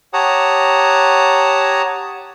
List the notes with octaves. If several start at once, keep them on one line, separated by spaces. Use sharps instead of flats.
G4 C#5 F#5 A5 A#5 D#6